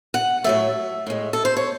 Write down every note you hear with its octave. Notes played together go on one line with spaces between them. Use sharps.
F#5
A2 F#3 A3 E5
A2 G#3
A4
C5
C#5